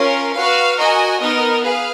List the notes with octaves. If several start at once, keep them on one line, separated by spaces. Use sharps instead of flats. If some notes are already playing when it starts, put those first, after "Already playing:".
Already playing: C#4 F4 A#4
F#4 B4 F5
F#4 A#4 D#5 G#5
B3 D#4 A#4 D#5
G#4 B4 F5